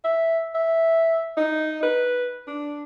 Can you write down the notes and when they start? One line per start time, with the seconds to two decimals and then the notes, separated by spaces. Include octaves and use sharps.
0.04 E5
0.55 E5
1.37 D#4
1.83 B4
2.47 D4